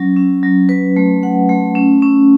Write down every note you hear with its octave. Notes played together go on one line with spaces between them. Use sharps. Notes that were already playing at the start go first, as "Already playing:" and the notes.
Already playing: F#3 C#4
C#4
F#3
B4
A3
F#5
A3
C#4
C#4